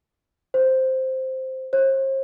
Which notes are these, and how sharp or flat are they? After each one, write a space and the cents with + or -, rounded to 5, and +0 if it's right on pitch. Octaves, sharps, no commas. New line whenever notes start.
C5 +0
C5 +40